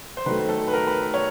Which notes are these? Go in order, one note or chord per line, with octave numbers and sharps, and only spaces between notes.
C5
D#3 F#3 A3 B4
A4
B4
A#4
B4
C#5